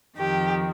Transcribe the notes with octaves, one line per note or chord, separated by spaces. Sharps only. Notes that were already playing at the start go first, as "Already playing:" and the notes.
F2 D#3 G4